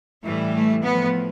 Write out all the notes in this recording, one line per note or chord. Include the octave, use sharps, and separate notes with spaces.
A2 E3 G3 A3
A3
A2 F3 B3